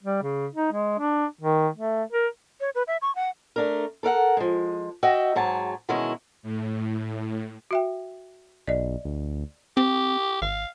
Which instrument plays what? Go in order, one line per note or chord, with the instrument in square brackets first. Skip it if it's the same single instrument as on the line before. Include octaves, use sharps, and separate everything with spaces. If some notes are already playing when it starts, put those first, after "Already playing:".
[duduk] G3
C#3
D#4
G#3
D4
D#3
A3
A#4
[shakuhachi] C#5
B4
E5
C#6
F#5
[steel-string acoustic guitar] A3 D4 A#4
A4 A#4 F5 F#5
F3 G#3
F#4 D#5 E5 G5
G#2 F#3 G#4 A5
B2 D#3 E3 G#3 C#4 E4
[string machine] A2
[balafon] F#4 E5 G5
[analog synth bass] B1 [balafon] D5 D#5
[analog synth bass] D2
[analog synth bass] C4 [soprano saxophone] G4
[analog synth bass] G#1 [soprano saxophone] F5